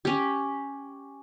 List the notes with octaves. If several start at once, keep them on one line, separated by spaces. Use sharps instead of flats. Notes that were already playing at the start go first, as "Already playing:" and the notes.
C#4 G4